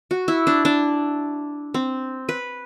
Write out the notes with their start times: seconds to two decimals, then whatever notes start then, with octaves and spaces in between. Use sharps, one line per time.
0.11 F#4
0.28 E4
0.47 D4
0.65 D4
1.74 C4
2.29 B4